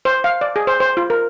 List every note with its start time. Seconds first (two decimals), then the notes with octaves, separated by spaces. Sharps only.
0.05 C5
0.24 F5
0.41 D5
0.56 G#4
0.67 C5
0.80 C5
0.97 F4
1.10 A#4